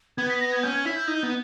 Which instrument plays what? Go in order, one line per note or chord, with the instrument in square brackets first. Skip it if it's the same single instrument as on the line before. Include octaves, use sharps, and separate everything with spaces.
[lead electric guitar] B3 [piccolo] G#6
[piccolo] B6
A#6
G#6
[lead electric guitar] C#4 [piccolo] G6
[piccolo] G#6
[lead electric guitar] E4 [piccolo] B6
[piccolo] G6
[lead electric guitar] D#4
B3